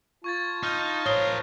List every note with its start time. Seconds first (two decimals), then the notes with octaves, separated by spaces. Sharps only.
0.24 F4 A5 C#6 G#6 A6
0.63 D#4 F6 G6
1.06 A#4 C5 C#5 D#6 G7